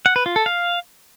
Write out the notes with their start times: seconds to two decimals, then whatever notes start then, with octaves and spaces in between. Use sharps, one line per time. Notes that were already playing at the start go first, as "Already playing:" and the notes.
0.06 F#5
0.16 B4
0.26 F4
0.36 A4
0.46 F5